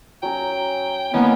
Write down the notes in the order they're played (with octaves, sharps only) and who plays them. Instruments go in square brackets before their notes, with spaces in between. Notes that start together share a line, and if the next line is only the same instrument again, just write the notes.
[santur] F#3 C#4 A#4 [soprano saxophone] G5
[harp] D#3 A#3 [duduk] B3 [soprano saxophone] C#4 [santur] E4